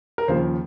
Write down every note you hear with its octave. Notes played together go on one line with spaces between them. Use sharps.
A#4
D#2 C#3 F3 C5